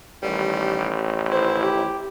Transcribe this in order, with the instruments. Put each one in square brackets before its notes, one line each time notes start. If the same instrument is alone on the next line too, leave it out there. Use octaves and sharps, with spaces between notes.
[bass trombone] A1 [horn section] D#3 G3
[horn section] D#3 E4 [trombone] C5
[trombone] G4